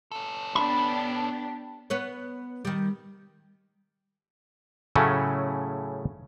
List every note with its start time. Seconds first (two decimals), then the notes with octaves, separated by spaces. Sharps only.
0.12 C#4 A4
0.55 B3 D4 G4 B5
1.90 B3 B4 C#5
2.65 D#3 G3
4.96 A2 C#3 F#3 A3 C#4 E4